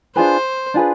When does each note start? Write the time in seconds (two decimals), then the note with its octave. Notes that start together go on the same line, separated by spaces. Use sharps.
0.16 D4 F4 G#4 B4 C5
0.74 D4 F4 G#4 B4